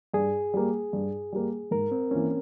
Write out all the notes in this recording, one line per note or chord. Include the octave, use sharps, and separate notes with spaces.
G2 G#4
G3 A#3
G2
G3 A#3
G#2 A#4
C4
E3 A#3 C#4